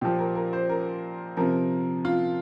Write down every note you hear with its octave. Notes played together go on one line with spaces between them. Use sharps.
A#2 F3 G4
A#4
A#4
C5
A#4
C3 F3 A#4
F4